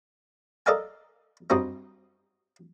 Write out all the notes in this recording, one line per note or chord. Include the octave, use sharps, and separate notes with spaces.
A4 A#4 D5 D#5 F5 G#5
G2 C4 D#4 F#4 D#5